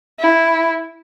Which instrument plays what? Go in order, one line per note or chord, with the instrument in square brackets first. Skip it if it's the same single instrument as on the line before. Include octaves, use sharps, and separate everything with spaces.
[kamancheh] E4